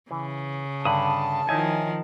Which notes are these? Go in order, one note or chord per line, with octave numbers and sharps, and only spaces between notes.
C#3 E3
G2 D3 A5 B5 D#6
D#3 F3 D#4 E4 C#5 G#5